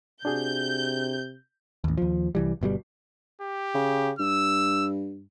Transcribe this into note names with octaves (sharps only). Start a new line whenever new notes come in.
C3 D4 F#4 G#4 G6
A1 D#2
D#2 F3
C2 E3 G3
G1 B2 D3 G3
G4
C#3
G2 E6